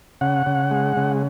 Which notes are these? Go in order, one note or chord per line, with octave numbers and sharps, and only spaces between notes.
C#3 F#5
C#3
G#3
C#3